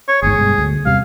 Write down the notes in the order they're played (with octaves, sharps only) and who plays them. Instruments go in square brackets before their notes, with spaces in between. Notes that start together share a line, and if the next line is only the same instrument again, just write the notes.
[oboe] C#5
[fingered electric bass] G1 D#2 G#2 [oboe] G#4
[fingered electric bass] G2 B2 G#3
D2
[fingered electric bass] E2 C3 G3 [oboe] F5